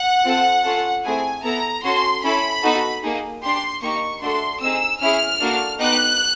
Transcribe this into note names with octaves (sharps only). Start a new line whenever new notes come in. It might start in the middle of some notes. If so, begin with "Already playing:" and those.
Already playing: F#5
C4 F4 A4
C#4 F4 A4
A3 C4 E4 G#4 G#5
B3 E4 A4 A#5
C#4 F#4 A4 C6
C#4 E4 A4 B5
B3 D#4 F#4 A4
A#3 D#4 G#4
D4 G4 C6
A#3 D#4 G4 C#6
A3 D4 F#4 A4 C6
C4 D#4 G#4 E6
C#4 E4 G#4 F6
A#3 D4 F#4 A4
B3 D#4 G4 F#6